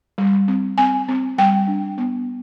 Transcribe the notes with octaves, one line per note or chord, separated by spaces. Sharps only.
G3
C4
C4 G#5
C4
G3 G5
D4
B3